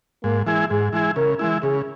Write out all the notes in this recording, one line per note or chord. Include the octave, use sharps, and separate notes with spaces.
G#2 A#3
E3 G#3 E4 G#4
G#2 G#4
E3 G#3 E4 G#4
C#3 A#4
E3 G#3 E4
C#3 G#4